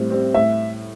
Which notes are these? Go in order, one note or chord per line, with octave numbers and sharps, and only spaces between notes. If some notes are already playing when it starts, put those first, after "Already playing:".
Already playing: A2 G3 C4
G3 C4
A2 E5